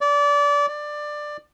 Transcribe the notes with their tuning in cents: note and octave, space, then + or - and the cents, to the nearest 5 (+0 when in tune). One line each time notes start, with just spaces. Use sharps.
D5 -25
D5 +15